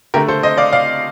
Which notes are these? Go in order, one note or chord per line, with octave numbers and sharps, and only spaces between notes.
D3 A3 G4 A#4
A4 C5
C5 D#5
D5 F5
D5 F5